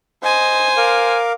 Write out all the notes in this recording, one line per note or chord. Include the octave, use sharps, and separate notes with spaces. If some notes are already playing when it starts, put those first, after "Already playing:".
C5 D#5 G#5
A#4 F5 D6